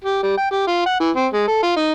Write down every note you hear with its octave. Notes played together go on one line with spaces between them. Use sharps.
G4
G3
G5
G4
F4
F#5
E3
C4
G#3
A4
F4
D#4